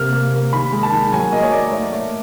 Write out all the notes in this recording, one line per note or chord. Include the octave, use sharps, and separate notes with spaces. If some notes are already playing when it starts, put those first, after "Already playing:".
Already playing: C3 A#3 F6
A#3
A#3
D#3 B5
G#3
A5
D#3
F#3 G#5
A#3 D#5
C#5
A#3 D5
A3
A3